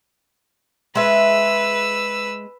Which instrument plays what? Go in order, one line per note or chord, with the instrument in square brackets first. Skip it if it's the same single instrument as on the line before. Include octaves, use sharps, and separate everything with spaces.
[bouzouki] G#3 E5 [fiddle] B4 E6